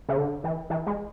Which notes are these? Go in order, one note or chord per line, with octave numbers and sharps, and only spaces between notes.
C#3
D3
E3
E3
G#3